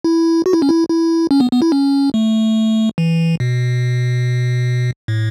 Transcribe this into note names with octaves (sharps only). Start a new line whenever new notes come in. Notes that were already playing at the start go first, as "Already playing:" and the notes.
E4
F#4
E4
C#4
E4
E4
C#4
B3
B3
E4
C#4
A3
E3
B2
A2